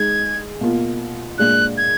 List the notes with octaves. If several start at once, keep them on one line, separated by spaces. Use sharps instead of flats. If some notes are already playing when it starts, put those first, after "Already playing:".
Already playing: G#3 D#4 G#4 G#6
B2 A#3 F4
A#2 G#3 D4 G#4 F#6
G#6